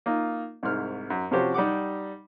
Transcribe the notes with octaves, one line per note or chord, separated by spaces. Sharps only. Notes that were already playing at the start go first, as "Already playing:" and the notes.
A#3 D#4 F4
C2 G#2 F6
F#2
C3 F3 C#4 F#4 G4 C5
G3 D#4 G4 F#5 D6